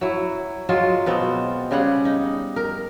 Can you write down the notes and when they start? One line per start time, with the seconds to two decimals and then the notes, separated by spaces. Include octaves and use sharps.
0.01 F#3 E4
0.69 F#3 G#3 F4
1.06 B2 B3 C4
1.71 C#3 G3 G#4 F#5
2.05 D#4
2.56 A#4